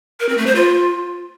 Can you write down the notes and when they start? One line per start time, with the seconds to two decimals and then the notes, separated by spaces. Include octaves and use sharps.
0.20 A#4
0.29 C4
0.38 A3
0.47 C5
0.55 F4